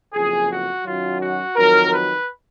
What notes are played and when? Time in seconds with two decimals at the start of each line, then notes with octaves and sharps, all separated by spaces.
0.14 F#1 F2 F3 G#4
0.50 F#4
0.84 F#2 D#3 F#3 F4
1.21 F#4
1.56 F2 D#3 F#3 A#4
1.92 B4